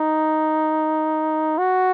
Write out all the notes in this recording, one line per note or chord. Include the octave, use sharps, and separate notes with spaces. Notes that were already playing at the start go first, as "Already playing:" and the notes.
Already playing: D#4
F#4